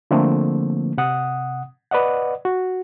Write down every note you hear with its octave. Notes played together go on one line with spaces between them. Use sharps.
D3 F3 A3 A#3 C4
C3 F#5 D#6
B4 D5 D#5 F#5
F#4